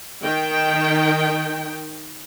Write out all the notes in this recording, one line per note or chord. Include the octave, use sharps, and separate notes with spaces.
D#3 G5